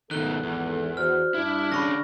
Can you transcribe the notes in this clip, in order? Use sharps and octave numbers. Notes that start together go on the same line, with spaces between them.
G#1 B2 D#3 B3 A4 F#6 G7
E2
F#4 C5 D5 F6
G2 D4 E4
D3 C#4 B5 C#6 A#6